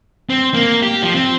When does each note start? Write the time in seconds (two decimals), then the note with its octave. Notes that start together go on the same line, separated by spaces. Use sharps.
0.30 C4
0.54 A#3
0.82 G4
1.03 F3
1.14 C4